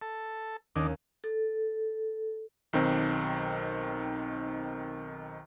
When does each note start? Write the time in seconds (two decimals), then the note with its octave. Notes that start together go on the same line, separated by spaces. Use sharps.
0.02 A4
0.76 D#2 D#3 C#4 D4
1.24 A4
2.73 B1 D#3 C4